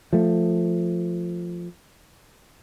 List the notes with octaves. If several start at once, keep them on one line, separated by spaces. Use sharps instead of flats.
F3 A3